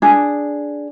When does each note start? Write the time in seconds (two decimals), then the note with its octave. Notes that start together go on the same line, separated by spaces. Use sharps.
0.02 D4 G#4